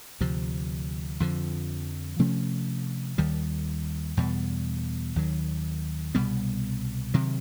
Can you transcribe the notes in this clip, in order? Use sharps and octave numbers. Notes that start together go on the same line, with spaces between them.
D2 C3 F3
F2 D3 F3
C3 F3 A3 C#4
D#2 D#3 G3
E2 B2 G3
D#2 D#3 F#3
C2 B2 G3 B3
C3 D#3 F#3